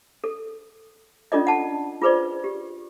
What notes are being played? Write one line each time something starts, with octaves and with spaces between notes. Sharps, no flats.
A4
C#4 D4 F4 A4 D5 D#5
F#5 A5
F4 G#4 B4 C5 D5
G4